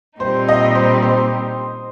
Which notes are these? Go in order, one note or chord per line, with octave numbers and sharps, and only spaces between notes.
A#2 G3 C4 D#4 G4 C5
D#5
C5
C5